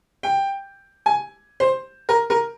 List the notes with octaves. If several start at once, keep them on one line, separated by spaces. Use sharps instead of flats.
G5
G#5
C5
A#4
A#4